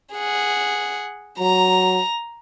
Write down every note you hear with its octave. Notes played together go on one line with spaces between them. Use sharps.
G#4 F#5
F#3 A#5